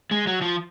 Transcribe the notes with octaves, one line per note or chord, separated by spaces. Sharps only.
G#3
F#3
F3